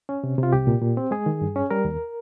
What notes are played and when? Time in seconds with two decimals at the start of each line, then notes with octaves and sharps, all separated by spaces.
0.09 C#4
0.24 C3
0.38 C3
0.43 F4
0.53 C2 G4
0.67 A#2
0.82 A#2
0.97 C4
1.11 G#3 G#4
1.26 D#3
1.41 G2
1.56 C#4
1.71 G3 A#4
1.85 D#2